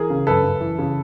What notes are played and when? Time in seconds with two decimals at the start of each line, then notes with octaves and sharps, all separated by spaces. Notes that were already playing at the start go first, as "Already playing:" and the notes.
Already playing: E3 G#4 A#4
0.10 C#3
0.27 F#2 A4 B4
0.44 F#2
0.61 E3
0.79 C#3